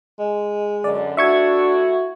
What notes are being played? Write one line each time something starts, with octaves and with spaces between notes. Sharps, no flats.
G#3
F#2 D3 D5
A3 D4 E4 F#4 E5 C#6 G#6